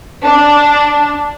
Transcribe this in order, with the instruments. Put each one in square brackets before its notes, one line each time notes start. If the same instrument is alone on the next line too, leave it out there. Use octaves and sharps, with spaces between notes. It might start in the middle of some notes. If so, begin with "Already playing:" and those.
[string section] D4